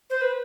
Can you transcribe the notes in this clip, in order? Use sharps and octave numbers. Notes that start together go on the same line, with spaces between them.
C5
B4